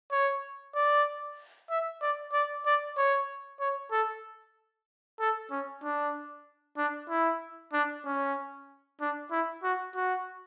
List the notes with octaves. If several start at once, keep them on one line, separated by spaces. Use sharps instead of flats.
C#5
D5
E5
D5
D5
D5
C#5
C#5
A4
A4
C#4
D4
D4
E4
D4
C#4
D4
E4
F#4
F#4